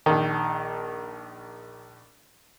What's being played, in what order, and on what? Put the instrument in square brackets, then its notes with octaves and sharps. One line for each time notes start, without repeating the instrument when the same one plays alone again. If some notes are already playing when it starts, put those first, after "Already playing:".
[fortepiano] A#1 D#3